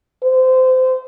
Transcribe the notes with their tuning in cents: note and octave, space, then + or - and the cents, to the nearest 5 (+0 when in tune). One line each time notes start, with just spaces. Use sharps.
C5 -25